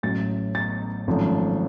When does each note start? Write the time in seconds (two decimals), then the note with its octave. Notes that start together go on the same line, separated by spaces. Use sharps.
0.03 A1 A2 F#3 A6
0.55 A6
1.07 G#1 F#2 F3 A3